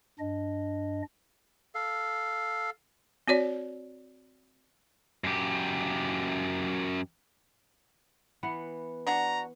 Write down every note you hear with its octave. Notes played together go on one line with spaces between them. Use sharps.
G2 D4 D#5
A4 F5
C4 F#4 C#5 D5
F#2 G4
E3 B3 F#5
D4 F#4 A#5